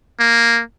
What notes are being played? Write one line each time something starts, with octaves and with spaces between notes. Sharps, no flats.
A#3